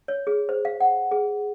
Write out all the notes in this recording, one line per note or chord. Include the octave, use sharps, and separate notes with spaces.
C#5
G#4
C5
F5
F#5
G#4